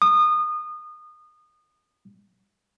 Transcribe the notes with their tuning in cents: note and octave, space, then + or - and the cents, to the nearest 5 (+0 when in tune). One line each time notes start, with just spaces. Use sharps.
D#6 -25